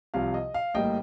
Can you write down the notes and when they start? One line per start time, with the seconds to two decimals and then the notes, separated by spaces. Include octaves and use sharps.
0.14 C2 C3 F3 F5
0.34 D#5
0.54 F5
0.74 A#1 A2 G3 A#3 D#5 G5